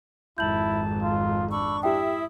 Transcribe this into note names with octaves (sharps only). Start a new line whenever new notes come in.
G#1 F2 E4 A5 G6 F#7
F4
D4 B5 C#6 E6
E4 G4 E5 G5 D#6